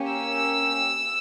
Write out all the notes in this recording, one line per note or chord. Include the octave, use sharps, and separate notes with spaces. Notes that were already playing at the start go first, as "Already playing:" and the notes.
Already playing: A#3 C#4 G4
E6